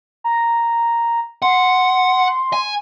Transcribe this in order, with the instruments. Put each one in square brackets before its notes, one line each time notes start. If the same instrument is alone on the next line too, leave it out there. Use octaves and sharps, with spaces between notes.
[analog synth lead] A#5
[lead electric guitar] F#5 [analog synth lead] C6
[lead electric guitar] G#5